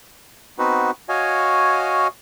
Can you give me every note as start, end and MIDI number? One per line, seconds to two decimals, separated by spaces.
0.59 0.91 59
0.59 0.91 60
0.59 0.91 63
0.59 0.91 66
0.59 0.91 71
1.09 2.07 66
1.09 2.07 73
1.09 2.07 75
1.09 2.07 77
1.09 2.07 80